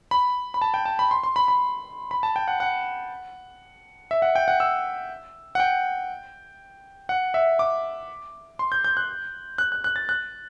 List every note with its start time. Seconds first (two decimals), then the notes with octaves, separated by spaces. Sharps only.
0.11 B5
0.54 B5
0.62 A5
0.74 G5
0.85 A5
0.99 B5
1.11 C6
1.23 C6
1.36 B5
1.48 B5
2.11 B5
2.23 A5
2.36 G5
2.48 F#5
2.60 F#5
4.11 E5
4.22 F#5
4.35 G5
4.48 F#5
4.60 E6
5.55 F#5
5.60 G5
7.09 F#5
7.34 E5
7.59 D6
8.59 C6
8.72 G6
8.84 G6
8.97 F#6
9.58 F#6
9.72 F#6
9.84 F#6
9.96 A6
10.09 F#6